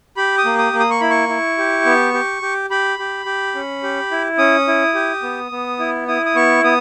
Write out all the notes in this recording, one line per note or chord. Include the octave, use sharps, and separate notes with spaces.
G4 B5
D#6
A#3
D#6
A#3
D#6
C#6
E4 B5
C#6
E4
G4
B3
G4
G4
G4 B5
G4
G4
C#4
G4
E4
C#4 D#6
E4
G4
B3
B3
E4
E4 D#6
D#6
B3 C#6
B3 D#6